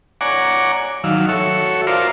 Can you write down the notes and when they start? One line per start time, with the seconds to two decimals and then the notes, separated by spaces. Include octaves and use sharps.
0.21 C#5 D5 F#5 G#5 A#5 D6
1.04 D#3 F#3 F5 E6
1.29 F#4 A4 C#5 E5
1.87 F4 A#4 C5 D5 E5 F5